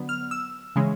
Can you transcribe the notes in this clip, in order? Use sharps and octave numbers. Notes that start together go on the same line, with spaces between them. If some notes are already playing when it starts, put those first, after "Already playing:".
Already playing: D3 F#3 B3
F6
E6
C#3 E3 G#3 C#4